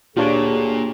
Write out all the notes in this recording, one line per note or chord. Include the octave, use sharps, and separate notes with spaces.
D2 A#2 D4 F4 G4 G#4 C#5